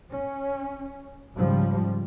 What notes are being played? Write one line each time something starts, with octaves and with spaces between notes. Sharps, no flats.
C#4
G#2 C#3 F3 G3